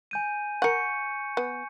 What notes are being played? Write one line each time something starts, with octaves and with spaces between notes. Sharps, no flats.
G#5 G6 D#7
A#4 F#5 C#6 G6 C#7
B3